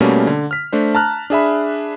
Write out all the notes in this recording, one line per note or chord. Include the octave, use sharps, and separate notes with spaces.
B2 G3 A3 A#3 C#4
D3
F6 B6
A3 D4 C5
A5 A#5 F6 F#6
D4 G#4 E5 B5